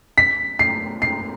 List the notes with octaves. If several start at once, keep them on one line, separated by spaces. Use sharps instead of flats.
B6
C7
C7